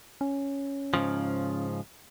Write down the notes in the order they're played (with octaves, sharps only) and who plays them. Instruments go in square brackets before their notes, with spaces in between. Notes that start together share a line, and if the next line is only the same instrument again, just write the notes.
[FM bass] C#4
[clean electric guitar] G#2 C#3 F3